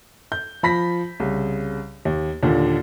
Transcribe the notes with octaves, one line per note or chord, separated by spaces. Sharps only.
G6
F3 B5 A#6 B6
C2 C#3
D#2
D#2 A#2 D3